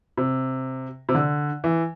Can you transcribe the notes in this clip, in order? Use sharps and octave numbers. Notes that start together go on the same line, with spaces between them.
C3
C3
D3
E3